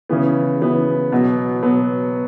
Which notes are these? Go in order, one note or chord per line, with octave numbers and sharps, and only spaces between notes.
C#3 E3 B3
C#3 E3 B3
B2 F#3 B3
B2 F#3 B3